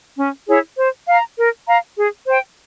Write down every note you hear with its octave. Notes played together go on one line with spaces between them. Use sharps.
C#4
E4 G#4 C#5
C5
F5 A#5
A#4
F5 A#5
G#4
C5 G5